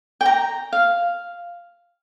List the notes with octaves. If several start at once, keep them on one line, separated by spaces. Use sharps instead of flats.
G5
A#5
F5